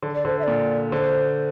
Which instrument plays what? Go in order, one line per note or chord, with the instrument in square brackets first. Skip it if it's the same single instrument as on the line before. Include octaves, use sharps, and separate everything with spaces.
[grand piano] D3
[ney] D5
[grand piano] D3 [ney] C5
[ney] E5
[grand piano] A#2 [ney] D5
[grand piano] D3 [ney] C5